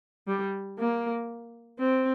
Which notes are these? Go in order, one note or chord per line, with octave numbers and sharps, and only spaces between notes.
G3
A#3
C4